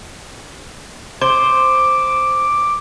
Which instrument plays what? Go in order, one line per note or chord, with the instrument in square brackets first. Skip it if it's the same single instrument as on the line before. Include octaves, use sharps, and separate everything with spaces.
[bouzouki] C5 [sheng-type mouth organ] D6